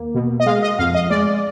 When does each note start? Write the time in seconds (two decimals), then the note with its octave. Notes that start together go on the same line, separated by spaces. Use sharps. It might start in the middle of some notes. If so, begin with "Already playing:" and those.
Already playing: D#2 A#3
0.14 B2
0.40 D#5
0.46 G#3 F5
0.62 D#5
0.79 F2 F5
0.95 D#5
1.10 G#3 D5